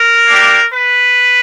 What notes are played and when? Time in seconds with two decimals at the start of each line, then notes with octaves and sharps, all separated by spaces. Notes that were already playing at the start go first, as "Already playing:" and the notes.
Already playing: A#4
0.27 A#3 D4 G4
0.72 B4